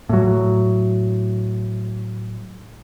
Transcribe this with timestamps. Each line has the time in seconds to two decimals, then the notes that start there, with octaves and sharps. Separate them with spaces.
0.09 A2 F#3